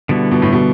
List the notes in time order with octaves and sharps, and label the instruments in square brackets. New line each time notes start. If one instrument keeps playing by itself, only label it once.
[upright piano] B2 [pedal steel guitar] D3 G3 B3 E4
[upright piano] B2
A2
B2